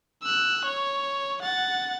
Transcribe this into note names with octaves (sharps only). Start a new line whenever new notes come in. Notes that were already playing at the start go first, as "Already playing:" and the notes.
E6 F#6
C#5
F#5 A6